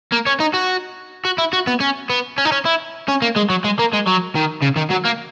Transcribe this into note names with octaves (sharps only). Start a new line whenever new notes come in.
A#3
C#4
D#4
F#4
F#4
E4
F#4
B3
C#4
B3
C#4
D#4
C#4
E4
C#4
A#3
G#3
F#3
G#3
A#3
G#3
F#3
D#3
C#3
D#3
F#3
A#3